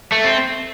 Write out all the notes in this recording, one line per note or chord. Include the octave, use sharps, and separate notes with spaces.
A3
C4